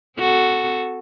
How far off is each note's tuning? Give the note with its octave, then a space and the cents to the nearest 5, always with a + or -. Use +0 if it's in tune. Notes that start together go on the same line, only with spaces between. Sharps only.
C4 -30 F#4 +0 A4 +0